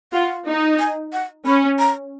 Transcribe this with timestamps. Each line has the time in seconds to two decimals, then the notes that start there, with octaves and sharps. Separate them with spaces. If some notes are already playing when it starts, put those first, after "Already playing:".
0.13 F4 F#5
0.47 D#4
0.79 G#5
1.13 F#5
1.46 C#4 B5
1.79 A#5